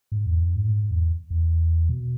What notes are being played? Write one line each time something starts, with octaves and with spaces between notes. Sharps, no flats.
G#2
E2
F2
G#2
A2
G#2
E2
E2
B2